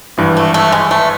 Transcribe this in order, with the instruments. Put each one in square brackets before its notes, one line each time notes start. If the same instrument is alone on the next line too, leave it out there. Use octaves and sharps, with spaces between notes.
[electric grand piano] G#1 G2 E3
[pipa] A3
A3
G#3
A3